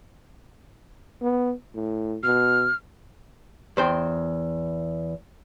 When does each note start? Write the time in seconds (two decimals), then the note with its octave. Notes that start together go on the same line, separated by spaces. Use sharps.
1.22 B3
1.74 A2
2.23 B2 F6
3.77 E2 C5 G5